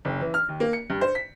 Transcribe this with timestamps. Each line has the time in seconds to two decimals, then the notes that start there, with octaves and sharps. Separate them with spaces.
0.05 F#1
0.21 E3
0.34 F6
0.49 D#2
0.60 A#3
0.73 C#7
0.90 G2
1.01 C5
1.15 B6